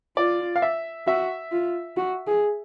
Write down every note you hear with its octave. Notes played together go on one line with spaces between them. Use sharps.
F4 D5
F5
E5
F#4 E5
F4
F#4
G#4